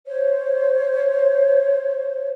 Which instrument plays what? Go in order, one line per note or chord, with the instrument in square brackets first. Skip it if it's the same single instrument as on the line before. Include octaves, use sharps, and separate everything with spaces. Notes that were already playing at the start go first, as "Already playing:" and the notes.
[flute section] C5 C#5